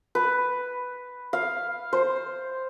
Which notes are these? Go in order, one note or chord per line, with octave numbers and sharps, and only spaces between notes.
B4
F5
C5